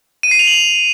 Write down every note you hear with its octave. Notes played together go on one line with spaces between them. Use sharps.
D#7
C7
F7
F#7